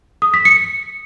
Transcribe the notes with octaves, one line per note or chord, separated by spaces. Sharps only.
D#6
B6
C#7